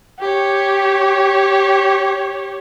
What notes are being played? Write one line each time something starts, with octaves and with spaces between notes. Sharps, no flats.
G4 C#5